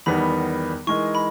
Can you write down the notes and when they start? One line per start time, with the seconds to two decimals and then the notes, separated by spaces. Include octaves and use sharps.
0.06 E2 D#3 G3 B3 B5
0.87 E3 G#3 D#4 A#4 D#5 C#6
1.15 B5